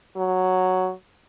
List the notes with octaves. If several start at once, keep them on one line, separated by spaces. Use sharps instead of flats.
F#3